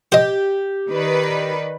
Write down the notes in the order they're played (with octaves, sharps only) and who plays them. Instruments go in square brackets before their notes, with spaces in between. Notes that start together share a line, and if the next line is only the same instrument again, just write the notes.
[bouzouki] G4 [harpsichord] C5 D#5
[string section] D#3 B4 D5